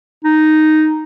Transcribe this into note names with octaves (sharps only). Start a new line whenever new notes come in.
D#4